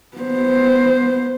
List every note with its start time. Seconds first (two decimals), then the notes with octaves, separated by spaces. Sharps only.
0.17 B3 C5